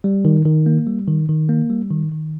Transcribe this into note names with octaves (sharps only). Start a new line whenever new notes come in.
G3
D#3
D#3
A#3
G3
D#3
D#3
A#3
G3
D#3
D#3